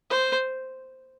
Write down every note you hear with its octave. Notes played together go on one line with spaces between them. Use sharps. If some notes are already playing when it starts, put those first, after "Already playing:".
C5